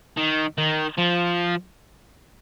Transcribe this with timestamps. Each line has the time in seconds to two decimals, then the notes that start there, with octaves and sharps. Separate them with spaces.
0.17 D#3
0.58 D#3
0.98 F3